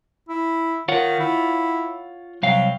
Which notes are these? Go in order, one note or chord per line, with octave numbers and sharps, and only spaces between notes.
E4
D#3 F4 C#5 F#5
E4
C2 F#3 F5 G5